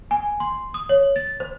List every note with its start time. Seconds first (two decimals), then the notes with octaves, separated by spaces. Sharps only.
0.11 G#5
0.40 C6
0.74 D#6
0.89 C#5
1.16 A6
1.40 C5